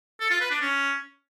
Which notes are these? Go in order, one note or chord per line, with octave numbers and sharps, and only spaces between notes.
A4
F4
B4
D4
C#4